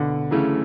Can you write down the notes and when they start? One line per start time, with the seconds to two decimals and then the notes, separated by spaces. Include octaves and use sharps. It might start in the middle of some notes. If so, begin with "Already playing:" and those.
Already playing: B2 D3
0.31 C#3 E3 F#3 A3 C#4